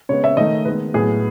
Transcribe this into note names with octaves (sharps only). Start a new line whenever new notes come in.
C#3 G#3 B3 C#5
E5
D#3 A3 D#5
D#3 G#3 B3 B4
A2 F#3 B3 G#4